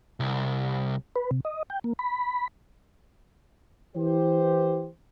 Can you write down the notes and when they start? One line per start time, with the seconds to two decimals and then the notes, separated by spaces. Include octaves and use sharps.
0.20 C2
1.16 B4
1.31 C3
1.45 D#5
1.70 G5
1.84 A#3
1.99 B5
3.96 E3 G4 C5